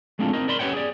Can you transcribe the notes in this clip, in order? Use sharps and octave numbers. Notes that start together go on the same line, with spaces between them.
G#3 A3 C4 D4 F4
C4 D#4 A#4
A#4 D5 B5 C6
C#4 G4 B4 C#5 F#5 G5
G#4 D5